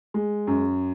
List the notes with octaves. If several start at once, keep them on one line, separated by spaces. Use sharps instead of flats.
G#3
F#2